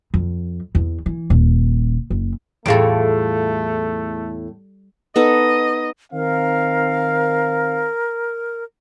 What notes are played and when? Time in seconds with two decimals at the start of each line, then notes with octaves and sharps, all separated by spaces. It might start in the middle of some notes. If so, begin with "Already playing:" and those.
0.14 F2
0.75 E2
1.06 E3
1.30 D#1
2.10 F#1
2.66 E2 A2 G3 A3 F4 G#4 A4 D7
5.16 B3 D#4 A4 D#5
6.13 D#3 C4 A#4 F5